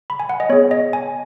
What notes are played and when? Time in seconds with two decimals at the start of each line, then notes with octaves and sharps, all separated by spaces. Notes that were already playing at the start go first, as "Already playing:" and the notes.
0.10 B5
0.20 G#5
0.29 F#5
0.40 D#5
0.49 B3 G#4 C#5
0.71 D#5
0.93 G#5